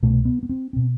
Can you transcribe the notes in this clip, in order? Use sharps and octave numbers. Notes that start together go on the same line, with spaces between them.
C2 B2 A3
B3
B3
C4
B2 C4